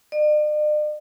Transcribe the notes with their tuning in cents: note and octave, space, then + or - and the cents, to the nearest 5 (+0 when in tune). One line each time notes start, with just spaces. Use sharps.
D5 +45